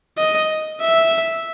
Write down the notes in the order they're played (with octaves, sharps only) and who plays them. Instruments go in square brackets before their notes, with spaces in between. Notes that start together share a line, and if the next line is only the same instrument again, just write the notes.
[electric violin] D#5
E5